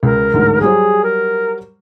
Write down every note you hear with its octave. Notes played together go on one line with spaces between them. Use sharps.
C#2 A#4
A1 D2 G#2
F#3 G3 G#4 C5
A#4